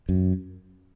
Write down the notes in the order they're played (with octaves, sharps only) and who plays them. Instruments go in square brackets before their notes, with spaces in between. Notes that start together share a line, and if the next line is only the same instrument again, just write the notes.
[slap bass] F#2